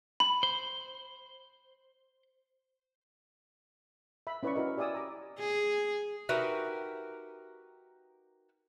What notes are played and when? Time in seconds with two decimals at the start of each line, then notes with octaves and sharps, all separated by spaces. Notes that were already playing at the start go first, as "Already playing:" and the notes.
0.20 B5
0.43 C5
4.27 E5 B5
4.43 C#4 E4 B4 D5 B5 C#6
4.55 C#4 E4 F#4 A#4 D#5
4.77 G4 D5 E5 G#5 D#6 E6
4.95 A#5 D6
5.39 G#4
6.29 D#4 F#4 G4 A#4 B4 E5